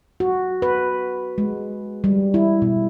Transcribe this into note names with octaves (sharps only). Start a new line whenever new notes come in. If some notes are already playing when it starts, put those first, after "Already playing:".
F#4
B4
G#3
G3
E4
B2